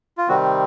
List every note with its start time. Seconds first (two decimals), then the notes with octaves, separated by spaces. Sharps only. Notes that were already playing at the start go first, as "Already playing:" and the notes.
0.18 F4
0.28 C3 D#3 G3 C4 F#4